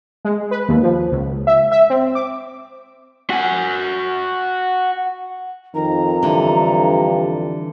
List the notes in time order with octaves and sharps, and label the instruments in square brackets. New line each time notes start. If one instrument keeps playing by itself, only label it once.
[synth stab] G#3
B4
D#2
F3
C#2
E5
E5
C4
D6
[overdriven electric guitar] F#4 G#5
[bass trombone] F2 [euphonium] D#3 [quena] A#5
[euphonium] G2 [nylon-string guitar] D3 E3